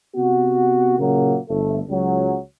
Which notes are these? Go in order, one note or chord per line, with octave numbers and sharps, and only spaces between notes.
C3 B3 F#4
A#2 C#3 F#3 A#3
G1 A3
C#2 F#3